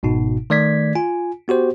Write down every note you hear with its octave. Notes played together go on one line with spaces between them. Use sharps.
G1 G#2 B2 D#4
D#3 A3 D5 G#6 B6
F4 G#5
B3 F#4 G4 C5